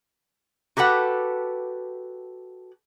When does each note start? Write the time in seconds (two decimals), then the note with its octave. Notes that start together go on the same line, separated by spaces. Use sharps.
0.77 F#4 G4 A4 B4 F#5